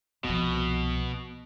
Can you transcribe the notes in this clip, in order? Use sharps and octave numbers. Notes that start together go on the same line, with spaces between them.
C2 B2 F3